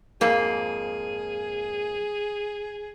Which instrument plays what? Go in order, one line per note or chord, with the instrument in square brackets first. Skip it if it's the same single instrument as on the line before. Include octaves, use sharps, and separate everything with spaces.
[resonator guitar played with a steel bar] F2 G#2 A#3 [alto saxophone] G#4